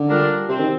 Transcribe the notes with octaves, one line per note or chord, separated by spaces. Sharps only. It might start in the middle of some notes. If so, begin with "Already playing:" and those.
Already playing: D3
G3 D4 F4 A#4
C3 C4
D#3